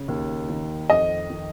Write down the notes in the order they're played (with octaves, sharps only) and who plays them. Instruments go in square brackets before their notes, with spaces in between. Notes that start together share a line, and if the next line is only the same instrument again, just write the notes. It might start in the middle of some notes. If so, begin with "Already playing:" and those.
Already playing: [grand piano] C#3
D#2
D#3
[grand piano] F2 [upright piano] D#5
[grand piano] D#3